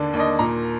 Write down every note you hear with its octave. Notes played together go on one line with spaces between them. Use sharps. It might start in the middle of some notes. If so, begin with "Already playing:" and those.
Already playing: D#2 D3 A#3 D5
D#2 D5
D#5
A#2 A#5